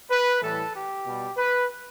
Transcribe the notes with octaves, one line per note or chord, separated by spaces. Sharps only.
B4
A2 E3 G3 A4
G4
B2 G3
B4